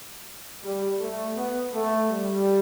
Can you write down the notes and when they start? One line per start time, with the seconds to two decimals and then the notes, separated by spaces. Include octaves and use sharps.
0.63 G3
0.99 A3
1.36 B3
1.73 A3
2.10 G3